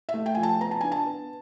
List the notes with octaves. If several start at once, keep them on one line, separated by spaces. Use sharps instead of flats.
E5
A3
G5
F3 G#5
A5
B3 A#5
A5
D4 G#5
A5
B3